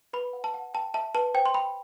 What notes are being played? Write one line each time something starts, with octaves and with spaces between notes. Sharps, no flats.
B4 B5
F#5
A5
F#5
G5 A5
E5 A5
B4 A5
C5 G5
C6
G5 B5